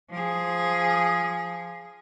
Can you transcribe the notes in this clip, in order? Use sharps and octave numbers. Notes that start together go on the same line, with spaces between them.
F3 G#4